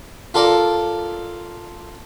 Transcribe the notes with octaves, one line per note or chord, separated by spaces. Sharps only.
F4 A4 A#4 D5